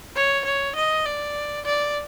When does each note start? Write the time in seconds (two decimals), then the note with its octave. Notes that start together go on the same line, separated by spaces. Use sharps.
0.16 C#5
0.45 C#5
0.76 D#5
1.05 D5
1.65 D5